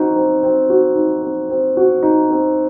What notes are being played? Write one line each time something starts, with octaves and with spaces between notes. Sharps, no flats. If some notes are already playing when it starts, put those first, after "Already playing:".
Already playing: C4 D#4 F#4
C4
C4
F#4
D#4
C4
C4
F#4
D#4
C4